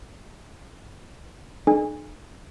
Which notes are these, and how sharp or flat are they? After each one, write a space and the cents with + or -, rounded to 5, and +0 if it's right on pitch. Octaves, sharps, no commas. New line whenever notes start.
D#4 -45 G#4 +40 G#5 -25